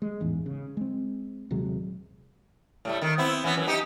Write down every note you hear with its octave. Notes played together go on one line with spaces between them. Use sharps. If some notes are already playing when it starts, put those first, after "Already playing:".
G#3
A1 E2 G#2
C#3
G#3 C4
D#1 C3 F#3 G#3
A2 G3 A3
D#3
B3 C4 E4
E3 B3 C#4
F#2 E3
D#4 G4 D#5